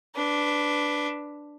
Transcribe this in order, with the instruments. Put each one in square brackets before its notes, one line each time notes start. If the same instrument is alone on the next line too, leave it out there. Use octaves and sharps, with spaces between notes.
[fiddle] D4 B4